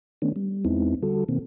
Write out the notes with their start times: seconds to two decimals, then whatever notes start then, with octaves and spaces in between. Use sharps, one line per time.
0.22 D#3 A3 B3 C#4 D4
0.36 G3
0.65 E2 G#3 B3 C4 D#4 E4
1.03 D3 G3 F#4 A4
1.29 B2 D#3 A#3 C4